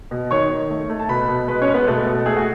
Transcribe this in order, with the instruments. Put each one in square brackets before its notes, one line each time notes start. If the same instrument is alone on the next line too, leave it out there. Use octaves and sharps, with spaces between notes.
[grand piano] B2
D#3 C#5 C#6
D#3
A3
A3
A5
B2 B4 B5
B2
G#3 B4 B5
C#4 C#5
G#3
B3 B4
B2 A3 A4
B2
A3 G#4
F#4